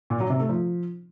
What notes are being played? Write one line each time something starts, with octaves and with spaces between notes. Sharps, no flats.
A#2
F#3
C3
A3
F3